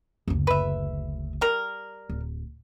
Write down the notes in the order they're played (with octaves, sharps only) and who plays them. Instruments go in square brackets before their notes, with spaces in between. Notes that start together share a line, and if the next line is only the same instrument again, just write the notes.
[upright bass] F#1 D2
[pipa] B4 E5
G3 A#4
[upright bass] D1